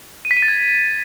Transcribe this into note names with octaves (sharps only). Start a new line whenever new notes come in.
D#7
B6
D#7
A6
G#6